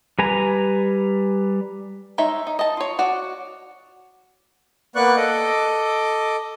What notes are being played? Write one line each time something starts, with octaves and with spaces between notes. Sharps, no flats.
G3 B4 G#5 A#5
G#3 D#4 C#5 E5
D#4
D#5 A5
F4 C#5
F#4 C#5 D5 F#5
A#3 B3 B4 D5 C#6 F#6
A4 D#5 D6